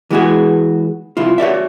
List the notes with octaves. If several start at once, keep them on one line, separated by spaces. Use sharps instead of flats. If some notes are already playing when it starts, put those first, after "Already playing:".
E3 G#3 B3 F4 F#4 G#4
C2 F2 E4 F4
F#4 C#5 D5 E5